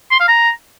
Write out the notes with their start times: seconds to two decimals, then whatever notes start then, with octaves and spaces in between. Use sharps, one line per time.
0.11 C6
0.20 F5
0.28 A#5